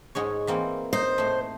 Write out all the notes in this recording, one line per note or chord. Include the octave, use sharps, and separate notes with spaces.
G#2 G#3 C#5
E3 A#3 C4
D#4 C5
A2 A3